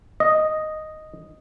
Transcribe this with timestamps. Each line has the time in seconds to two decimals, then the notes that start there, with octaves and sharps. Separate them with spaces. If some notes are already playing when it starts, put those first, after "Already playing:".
0.20 D#5